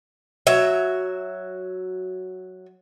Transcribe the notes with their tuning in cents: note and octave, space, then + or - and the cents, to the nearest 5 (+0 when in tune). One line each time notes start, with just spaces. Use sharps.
F#3 +0 E5 +0